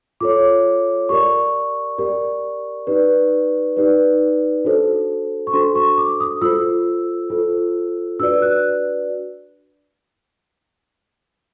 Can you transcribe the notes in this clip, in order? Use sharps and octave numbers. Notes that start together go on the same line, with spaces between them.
F4 A4 C#5 D6
G4 A#4 D5 C#6
G4 A#4 D5
D#4 G4 B4 D5
D#4 G4 B4 D5
D4 F#4 A4 C5
C#6
D4 F#4 A4 C5 C6
C#6
D6
D#6
F4 A4 C5 E6
F4 A4 C5
D4 F#4 B4 D5 E6
F#6